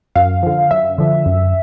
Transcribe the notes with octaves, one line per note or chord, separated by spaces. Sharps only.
F#2 F5
D3 F3
F#2 E5
D3 F3
F#2